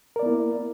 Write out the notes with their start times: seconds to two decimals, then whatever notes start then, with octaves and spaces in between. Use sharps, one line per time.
0.16 A#4
0.19 D5
0.23 B3
0.26 E4
0.29 A#3